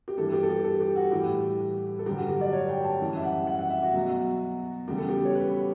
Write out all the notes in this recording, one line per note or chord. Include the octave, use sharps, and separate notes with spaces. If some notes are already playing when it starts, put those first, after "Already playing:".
G4
G2 E3 G3 A4
G4
A4
G4
A4
G4
F#4
A2 E3 G3 G4
A4
G2 D3 F#3 G4
F#4
G4
D5
C#5
G5
A5
F#2 E3 G3
E5
F#5
F#5
F#5
E5
F#4
B2 F#3
E2 C#3 G3 G4
A4
G4
C#5
B4